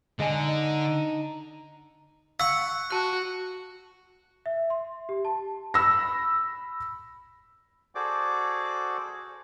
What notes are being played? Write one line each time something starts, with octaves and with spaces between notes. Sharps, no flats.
D3 G#3 D#5 G#5
D#4
F5 F#5 C#6 E6
F#4 A5 F#6
E5
C6
G4
A5
B5 E6 A#6
F#4 G#4 A4 C5 D5 D6